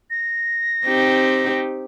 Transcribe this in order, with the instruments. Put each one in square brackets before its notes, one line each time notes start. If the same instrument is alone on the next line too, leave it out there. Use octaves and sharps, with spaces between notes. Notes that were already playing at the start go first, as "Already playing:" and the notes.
[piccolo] A#6
[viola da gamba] C4 D#4 G4